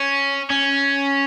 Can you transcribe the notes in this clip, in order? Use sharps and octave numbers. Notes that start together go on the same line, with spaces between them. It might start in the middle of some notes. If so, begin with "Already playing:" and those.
Already playing: C#4
C#4